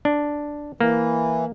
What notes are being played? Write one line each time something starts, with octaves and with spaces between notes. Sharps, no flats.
D4
E3 A#3